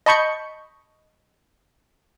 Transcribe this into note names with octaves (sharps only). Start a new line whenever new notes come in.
D#5 A5 B5 C#6 G6 C#7